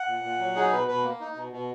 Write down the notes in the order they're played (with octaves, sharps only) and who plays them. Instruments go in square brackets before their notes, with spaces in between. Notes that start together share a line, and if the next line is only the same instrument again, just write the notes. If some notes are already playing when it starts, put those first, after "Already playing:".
Already playing: [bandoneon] F#5
A#2
A#2
F#3
D#4 G#4
B2 B4
B2 B4
A#3
D#4
B2
B2